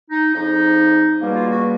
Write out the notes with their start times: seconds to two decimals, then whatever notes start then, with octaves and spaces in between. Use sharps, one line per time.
0.10 D#4
0.33 F2 C#3 F3 D#4
1.20 C#2 B2 G3 A#3
1.35 F4
1.50 F#4